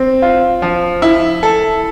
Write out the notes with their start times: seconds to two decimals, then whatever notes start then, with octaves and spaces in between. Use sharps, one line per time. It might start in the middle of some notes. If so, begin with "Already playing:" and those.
Already playing: C4
0.22 F4
0.62 F3
1.02 E4
1.43 A4